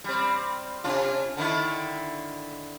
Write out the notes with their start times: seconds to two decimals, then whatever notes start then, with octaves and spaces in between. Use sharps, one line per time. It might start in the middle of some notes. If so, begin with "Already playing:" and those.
0.04 G3 C4
0.84 C3 D4 F4
1.37 D3 D#3 E4